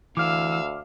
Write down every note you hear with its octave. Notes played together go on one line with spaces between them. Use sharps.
D2 E3 F5 D6 E6 F6